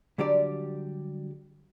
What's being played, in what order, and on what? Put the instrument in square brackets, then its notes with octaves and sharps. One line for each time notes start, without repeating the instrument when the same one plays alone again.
[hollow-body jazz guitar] D3 F#3 G3 D4 G4 D5